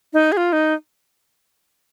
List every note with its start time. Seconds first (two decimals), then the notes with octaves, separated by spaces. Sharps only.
0.13 D#4
0.32 G#4
0.37 F4
0.53 D#4